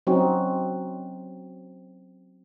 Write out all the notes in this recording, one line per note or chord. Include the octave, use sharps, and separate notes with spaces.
F#3 C4 C#4 D#4 F#4